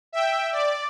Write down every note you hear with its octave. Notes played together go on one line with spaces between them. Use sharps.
E5 G5
D5